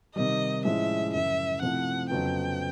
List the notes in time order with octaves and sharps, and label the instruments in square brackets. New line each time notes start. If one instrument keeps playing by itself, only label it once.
[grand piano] C3 D#3 G3 [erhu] D#5
[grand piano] A2 F3 G#3 C#4 E4 [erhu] E5
[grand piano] F#2 C#3 F3 [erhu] E5
[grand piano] C3 F3 A3 C4 E4 [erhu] F#5
[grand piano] F2 C#3 F#3 B3 [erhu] G5